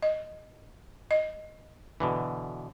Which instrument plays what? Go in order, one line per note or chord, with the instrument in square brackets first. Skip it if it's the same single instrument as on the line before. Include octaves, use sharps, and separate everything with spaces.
[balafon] D#5
D#5
[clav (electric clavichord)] B2 D3 E3